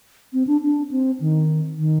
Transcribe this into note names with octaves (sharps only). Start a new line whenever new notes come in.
C4
D4
D4
C4
D#3
D#3